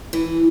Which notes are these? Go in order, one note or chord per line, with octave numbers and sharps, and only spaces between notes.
E3